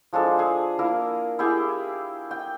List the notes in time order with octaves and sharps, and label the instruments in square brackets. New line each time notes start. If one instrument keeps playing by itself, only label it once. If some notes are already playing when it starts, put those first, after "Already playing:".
[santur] F3 G#3 D4 A4
G#4 A5
A#3 E4 A#4
E4 G4 G#4 G5
G5